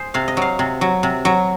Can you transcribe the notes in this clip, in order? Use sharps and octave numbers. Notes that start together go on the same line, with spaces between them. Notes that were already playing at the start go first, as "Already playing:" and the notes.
Already playing: G#4 C5
C3 F5
D#5
F#3 F5
C3
F#3
C3
F#3